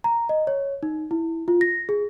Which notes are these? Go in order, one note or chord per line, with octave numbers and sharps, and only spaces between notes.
A#5
D#5
C#5
D#4
E4
F4
A#6
G#4